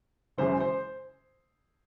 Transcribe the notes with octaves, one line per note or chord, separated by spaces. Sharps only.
F#1 F#2 C#3 E3 G#3 C5
C5